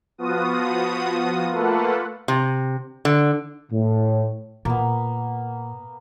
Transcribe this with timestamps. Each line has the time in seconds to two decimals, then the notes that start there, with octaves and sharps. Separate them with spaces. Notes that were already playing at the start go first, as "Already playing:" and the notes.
0.18 F3 B3 F4 F#4 D#6
1.50 A3 A#3 F4 A4 B4 F#5
2.28 C3
3.05 D3
3.72 A2
4.65 A#2 A#3 B3